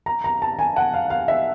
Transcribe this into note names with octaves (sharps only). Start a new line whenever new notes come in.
A#5
A#5
A5
G#5
F#5
F5
F5
E5